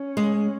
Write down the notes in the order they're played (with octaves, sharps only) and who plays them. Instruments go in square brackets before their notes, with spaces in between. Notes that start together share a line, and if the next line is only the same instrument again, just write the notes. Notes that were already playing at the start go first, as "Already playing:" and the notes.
Already playing: [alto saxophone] C#4
[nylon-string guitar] G#3